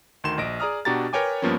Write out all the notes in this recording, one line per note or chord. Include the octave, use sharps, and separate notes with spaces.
D2 D#3 C6 E7
A#1 D#5 A#6 D7
G#4 D5 A#5 D#6 F6
B2 D4 F#4 G4 A#5 A6
A#4 B4 C#5 G5 G#5 D6
G2 F3 A#3 B3 C#4